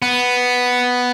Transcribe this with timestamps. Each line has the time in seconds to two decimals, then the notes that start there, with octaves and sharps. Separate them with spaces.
0.02 B3